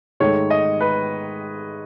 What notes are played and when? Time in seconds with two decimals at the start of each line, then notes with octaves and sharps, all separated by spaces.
0.20 G#2 D#3 A3 C#5
0.50 D#5
0.80 B4